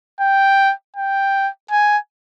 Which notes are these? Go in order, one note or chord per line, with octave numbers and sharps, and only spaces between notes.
G5
G5
G#5